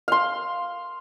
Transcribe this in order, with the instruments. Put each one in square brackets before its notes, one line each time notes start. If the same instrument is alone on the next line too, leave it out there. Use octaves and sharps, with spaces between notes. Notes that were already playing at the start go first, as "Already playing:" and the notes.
[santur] F5 C6